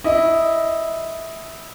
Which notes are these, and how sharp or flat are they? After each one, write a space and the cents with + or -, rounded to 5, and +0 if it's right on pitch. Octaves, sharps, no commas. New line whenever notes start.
E4 -10 D#5 +0